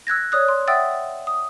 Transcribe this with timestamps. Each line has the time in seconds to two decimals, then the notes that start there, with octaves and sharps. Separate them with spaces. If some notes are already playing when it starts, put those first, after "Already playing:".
0.07 E6 F#6 G#6 A#6
0.32 C#5 D5 D#6 F#6
0.48 C6
0.68 E5 F#5 G5 D#6 E6 A6
1.27 D#6